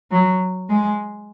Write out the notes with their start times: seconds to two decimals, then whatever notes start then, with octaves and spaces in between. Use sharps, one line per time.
0.11 F#3
0.69 G#3